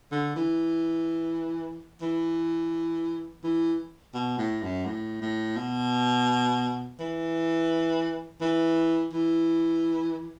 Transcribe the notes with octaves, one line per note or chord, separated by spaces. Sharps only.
D3
E3
E3
E3
B2
A2
F#2
A2
A2
B2
E3
E3
E3